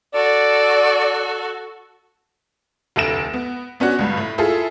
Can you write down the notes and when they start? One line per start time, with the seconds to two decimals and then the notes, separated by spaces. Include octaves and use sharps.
0.14 F#4 A4 D5
2.96 F1 D2 A4 A#6 D7 E7
3.33 B3
3.80 B3 C#4 D4 F#4
3.99 C#2 G2
4.17 A2
4.38 E4 F4 G#4 A4